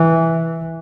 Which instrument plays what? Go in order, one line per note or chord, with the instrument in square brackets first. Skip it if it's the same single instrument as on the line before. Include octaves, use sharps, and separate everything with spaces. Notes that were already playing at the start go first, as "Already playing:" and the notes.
Already playing: [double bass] E3